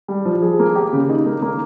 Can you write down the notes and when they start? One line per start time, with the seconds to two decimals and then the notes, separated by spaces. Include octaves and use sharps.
0.08 G3
0.25 F3
0.42 G#4
0.59 A#3
0.76 G4
0.93 C#3
1.10 D#4
1.26 A#3
1.42 A#3